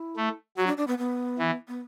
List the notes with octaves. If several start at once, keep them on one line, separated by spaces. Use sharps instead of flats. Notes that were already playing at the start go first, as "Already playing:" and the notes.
Already playing: E4
A3
F#3 F#4
D4
D4
B3
B3
E3
B3